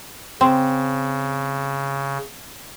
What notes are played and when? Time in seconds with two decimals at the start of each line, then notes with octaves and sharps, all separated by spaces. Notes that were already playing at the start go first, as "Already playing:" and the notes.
0.41 C#3 C4